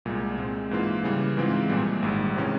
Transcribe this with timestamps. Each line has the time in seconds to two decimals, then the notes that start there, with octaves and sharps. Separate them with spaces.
0.05 C2 A#2 G#3
0.38 A#2 G#3 C4
0.71 G#2 E3 A#3 F4
1.04 C#3 E3 G3
1.37 G#2 E3 G#3 C4 F4
1.69 A#1 A#2 G3
2.02 G#1 G#2 G3
2.36 C3 E3 G#3 C#4